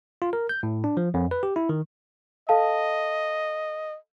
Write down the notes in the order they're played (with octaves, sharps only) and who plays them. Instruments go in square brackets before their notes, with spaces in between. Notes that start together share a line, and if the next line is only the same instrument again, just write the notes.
[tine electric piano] F4
A#4
G6
A2
D4
F3
F2
B4
G4
E4
D#3
[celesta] A4 F5 A5 [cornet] D#5